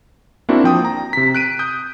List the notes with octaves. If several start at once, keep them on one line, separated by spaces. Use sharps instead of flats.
A#3 C4 D4 E4 F#4
F3 G5 D#6
A#5
C3 B6
F#6 D7 D#7
D#6 G6